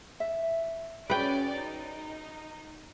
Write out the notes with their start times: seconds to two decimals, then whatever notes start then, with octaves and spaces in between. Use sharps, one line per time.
0.20 E5
1.10 C#4 F#4 G#4 B4 C#5 D5 G5
1.55 D#4